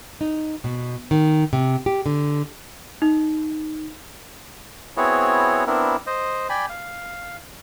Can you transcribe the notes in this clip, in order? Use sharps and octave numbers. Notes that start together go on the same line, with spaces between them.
D#4
B2
D#3
C3
G4
D3
D#4
B3 C4 E4 F#4 G#4 C#5
B3 C4 D4 E4 A#4
C5 D#5
D5 G5 G#5 B5
F5